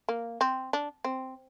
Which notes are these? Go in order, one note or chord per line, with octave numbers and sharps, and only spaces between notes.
A#3
C4
D4
C4